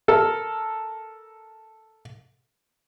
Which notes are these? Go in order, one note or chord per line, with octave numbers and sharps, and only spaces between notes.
A4 A#4